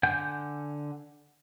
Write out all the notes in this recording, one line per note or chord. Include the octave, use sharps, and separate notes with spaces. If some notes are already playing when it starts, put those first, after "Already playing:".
D3 F#5 G#5 G6